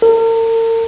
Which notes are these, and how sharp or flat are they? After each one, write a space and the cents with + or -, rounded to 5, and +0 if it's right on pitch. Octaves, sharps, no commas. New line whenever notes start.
A#4 -45